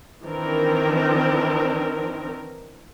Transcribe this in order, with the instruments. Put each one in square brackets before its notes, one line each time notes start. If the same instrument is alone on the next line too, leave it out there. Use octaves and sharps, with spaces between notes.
[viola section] D#3 E3 C4 D4 A#4